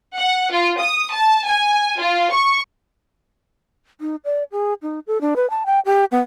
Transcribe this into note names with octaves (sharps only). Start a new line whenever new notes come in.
F#5
F4
D#6
A5
G#5
F4
C#6
D#4
D5
G#4
D#4
A4
D4
B4
A5
G5
G4
B3